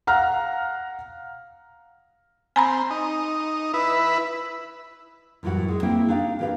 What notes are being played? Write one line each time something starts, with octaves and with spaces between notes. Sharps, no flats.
F5 F#5 A#5 F6
C4 G#5 A#5 B5
D#4
E4 B4
F#2 A2 E3 G3 F#4
G#3
A#3 C4 E4 E5 G5
D4 D#4 G4 F5
A2 D#3 G4 B4 F5